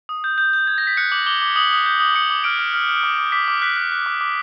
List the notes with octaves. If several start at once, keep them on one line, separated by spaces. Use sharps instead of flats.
D#6
G6
G6
G6
G6 G#6
G6 A#6
B6
F#6 C#7
D6 F#7
D6 G7
D6
D#6 F#7
D#6
G6
D#6
D6 C#7
D6
F6 D7
F6
F6
F6
D6
D6
D6 B6
D6
F#6 B6
F#6
F#6
D6
D6